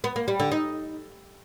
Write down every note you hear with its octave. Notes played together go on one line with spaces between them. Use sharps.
B3
A#3
G3
D3
D#4